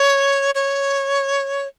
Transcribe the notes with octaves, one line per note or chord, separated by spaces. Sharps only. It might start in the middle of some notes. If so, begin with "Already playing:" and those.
Already playing: C#5
C#5